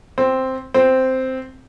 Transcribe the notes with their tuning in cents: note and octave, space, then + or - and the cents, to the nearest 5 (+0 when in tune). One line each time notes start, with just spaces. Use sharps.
C4 +0
C4 -5